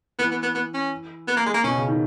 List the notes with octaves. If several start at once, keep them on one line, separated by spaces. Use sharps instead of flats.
E3 B3
B3
B3
B3
C#4
B3
A#3
G#3
A#3
B2 C#4
C#3
D#3